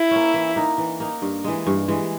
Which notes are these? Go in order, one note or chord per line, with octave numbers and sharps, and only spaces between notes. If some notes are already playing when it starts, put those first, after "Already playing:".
Already playing: E4
A#3 C#4
E3
A#3 D#4
E3
A#3 D#4
G2
E3 G#3
G2
E3 G#3